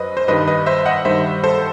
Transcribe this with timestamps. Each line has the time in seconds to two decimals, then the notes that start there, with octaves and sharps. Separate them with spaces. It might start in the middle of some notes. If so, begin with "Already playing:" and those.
Already playing: F#2 F#3 B4 C5 D#5
0.17 C5
0.28 G2 D#3 G3 B4 D#5
0.47 B4 D#5
0.66 C5 E5
0.86 D#5 F#5
1.05 G2 D#3 G3 C5 E5
1.44 A4 C5